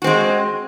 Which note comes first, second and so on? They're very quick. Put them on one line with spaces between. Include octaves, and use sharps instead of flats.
F#4 C4 G#3